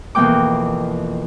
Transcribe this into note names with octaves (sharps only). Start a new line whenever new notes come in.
F2 B2 E3 A#3 G5 D6